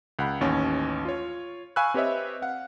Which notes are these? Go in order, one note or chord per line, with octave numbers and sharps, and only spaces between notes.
C#2 F#5 B5
A1 D#2 C#4
F4 C#5
F5 G#5 B5 C#6 E6 F#6
C4 G4 B4 C#5 D#5 E5
F5 F#5